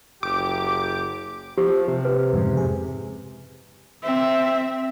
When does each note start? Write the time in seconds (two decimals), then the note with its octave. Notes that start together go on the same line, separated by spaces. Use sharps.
0.23 F#1 G4 D6
1.58 F3 G4
1.88 C3
2.05 B4
2.33 F2 G#2 C#3
2.57 G#4
4.03 C4 E5